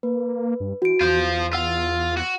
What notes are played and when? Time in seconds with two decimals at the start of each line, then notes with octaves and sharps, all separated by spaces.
0.03 A#3 B4
0.60 G2
0.82 E3 F#4 D7
1.01 E2 F4 C5 G6
1.53 F4 F#5 E6
2.17 F#4